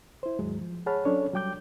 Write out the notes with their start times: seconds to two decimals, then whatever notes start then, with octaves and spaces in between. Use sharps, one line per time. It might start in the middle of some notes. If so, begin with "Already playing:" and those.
0.23 E4 C5
0.39 D#2 G#2 F#3 G#3
0.61 F3
0.86 G#4 C#5 F#5 A5 B5 F6
1.05 F#3 C#4 D4 A4 C#5
1.33 F#3 G3 G5 D6 G6